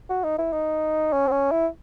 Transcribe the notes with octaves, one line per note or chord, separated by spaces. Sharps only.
F#4
D#4
E4
D#4
C#4
C4
C#4
E4